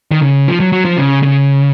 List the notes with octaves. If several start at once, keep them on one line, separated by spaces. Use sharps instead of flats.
D#3
C#3
F3
F#3
F#3
F3
C#3
C#3